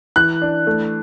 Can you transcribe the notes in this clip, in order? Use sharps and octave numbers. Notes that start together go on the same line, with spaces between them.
E3 F#6
D4
A3